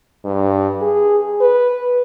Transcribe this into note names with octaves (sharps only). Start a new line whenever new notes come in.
G2
G#4
B4